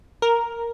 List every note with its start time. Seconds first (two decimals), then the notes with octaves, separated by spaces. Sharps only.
0.22 A#4